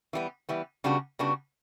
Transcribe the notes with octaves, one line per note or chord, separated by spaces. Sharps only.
E3 G3 B3
E3 G3 B3
C#3 G3 B3 D4 F#4
C#3 G3 B3 D4 F#4